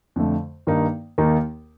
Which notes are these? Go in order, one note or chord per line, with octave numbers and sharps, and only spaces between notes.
F2 D3 A3
G2 D#3 A#3 D#4
D#2 D#3 A#3 D#4